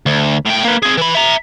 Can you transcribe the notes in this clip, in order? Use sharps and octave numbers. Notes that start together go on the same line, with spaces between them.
D2
A2 G5
A#3 B4
C4 G#4
E3 B5
E5 A#5